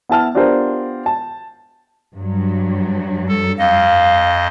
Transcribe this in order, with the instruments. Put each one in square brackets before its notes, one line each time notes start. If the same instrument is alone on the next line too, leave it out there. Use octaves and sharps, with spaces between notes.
[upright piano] B3 E4 A5 F6
B3 D4 F4 G4 A#4 C5
A5
[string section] G2 F#3
[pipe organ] A4
[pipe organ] F2 D#5 [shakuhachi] F5